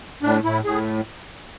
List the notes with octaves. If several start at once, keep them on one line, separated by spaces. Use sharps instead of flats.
A2 D4
A2 E4
A2 G#4